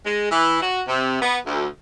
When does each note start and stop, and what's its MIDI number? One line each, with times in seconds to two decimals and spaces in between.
0.05 0.29 56
0.30 0.58 52
0.61 0.81 66
0.86 1.17 48
1.21 1.37 59
1.45 1.66 38